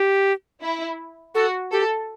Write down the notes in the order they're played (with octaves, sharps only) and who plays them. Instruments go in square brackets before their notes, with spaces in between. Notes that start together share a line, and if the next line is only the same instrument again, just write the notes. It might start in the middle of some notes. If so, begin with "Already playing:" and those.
Already playing: [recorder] G4
[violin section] E4
[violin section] F#4 [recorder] A4
[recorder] G4 [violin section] A4